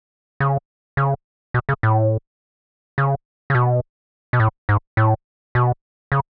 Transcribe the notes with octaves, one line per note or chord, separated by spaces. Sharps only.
C#3
C#3
B2
C#3
A2
C#3
C#3
B2
B2
A2
G#2
A2
B2
C#3